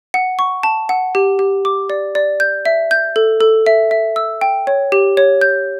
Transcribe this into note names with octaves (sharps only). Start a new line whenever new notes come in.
F#5
C#6
A5
F#5
G4
G4
D6
D5
D5
G6
E5
G6
A4
A4
E5
E5
E6
G5
C#5
G4
C#5
G6